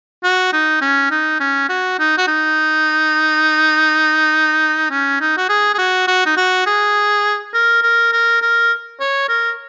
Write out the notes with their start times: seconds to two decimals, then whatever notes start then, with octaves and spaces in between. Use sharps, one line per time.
0.24 F#4
0.53 D#4
0.81 C#4
1.11 D#4
1.40 C#4
1.69 F#4
1.99 D#4
2.18 F#4
2.28 D#4
4.90 C#4
5.21 D#4
5.37 F#4
5.49 G#4
5.74 G#4
5.78 F#4
6.08 F#4
6.26 D#4
6.37 F#4
6.66 G#4
7.54 A#4
7.83 A#4
8.13 A#4
8.42 A#4
9.00 C#5
9.29 A#4